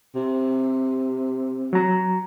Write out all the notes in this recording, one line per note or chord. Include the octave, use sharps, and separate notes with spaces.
C3
F#3 A#5